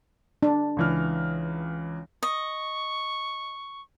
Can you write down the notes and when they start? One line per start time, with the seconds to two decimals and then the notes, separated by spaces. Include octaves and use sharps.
0.43 D4
0.77 C#2 E3 F6
2.23 D#5 C#6